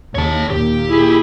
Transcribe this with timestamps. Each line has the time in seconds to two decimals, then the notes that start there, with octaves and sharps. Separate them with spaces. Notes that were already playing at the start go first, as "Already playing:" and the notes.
0.15 D#2 C#3 C#5 A5
0.50 D#2 A#2 G4
0.89 E4 G#4